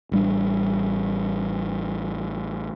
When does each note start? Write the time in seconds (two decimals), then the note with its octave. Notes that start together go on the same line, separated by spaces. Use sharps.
0.12 A1 G3 D4